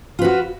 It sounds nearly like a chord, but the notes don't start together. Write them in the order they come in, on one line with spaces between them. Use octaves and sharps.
F4 B4 F#4